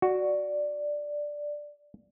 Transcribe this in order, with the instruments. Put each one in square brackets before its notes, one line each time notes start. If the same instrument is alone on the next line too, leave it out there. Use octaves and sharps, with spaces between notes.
[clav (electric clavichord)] F#4 [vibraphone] D5